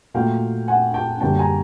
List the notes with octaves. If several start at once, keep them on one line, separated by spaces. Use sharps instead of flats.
A#2 F#3 A3 F5 G5
F#5 G#5
G5 A5
F#2 D3 G3 A#3 G5 A5
G#5 A#5